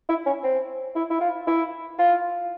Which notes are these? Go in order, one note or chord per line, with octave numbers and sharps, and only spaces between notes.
E4
C#4
C4
E4
E4
F4
E4
F4